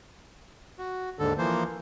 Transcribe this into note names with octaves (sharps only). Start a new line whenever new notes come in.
F#4
D#2 G#2 D3 A4
E3 F3 A#3 C5